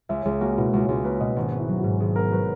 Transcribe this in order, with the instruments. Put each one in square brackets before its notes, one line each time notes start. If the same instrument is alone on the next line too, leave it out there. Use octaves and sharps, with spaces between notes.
[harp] C#2 [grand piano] E5
[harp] C#2 [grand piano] G#4
[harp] A#3 [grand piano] F#4
[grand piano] F#4
[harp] B2 [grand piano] E4
[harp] C#2 [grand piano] F#4
[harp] C#2 [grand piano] G#4
[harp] A#3 [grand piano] B4
[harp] B2 [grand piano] D#5
[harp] G#1 [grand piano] F#4
[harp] B3
[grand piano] E4
[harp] F#3
[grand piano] F#4
[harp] G#2
[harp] G#1 [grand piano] G#4
[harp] B3 [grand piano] A#4
[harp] F#3 [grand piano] B4